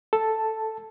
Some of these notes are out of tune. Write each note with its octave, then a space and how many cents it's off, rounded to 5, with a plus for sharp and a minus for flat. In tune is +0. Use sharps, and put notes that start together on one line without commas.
A4 +0 A5 +0